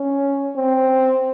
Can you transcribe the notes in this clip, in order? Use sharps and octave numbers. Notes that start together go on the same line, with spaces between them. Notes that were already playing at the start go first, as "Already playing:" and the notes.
Already playing: C#4
C4